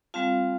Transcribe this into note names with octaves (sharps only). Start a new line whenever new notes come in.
G3 C4 F4 F5 A5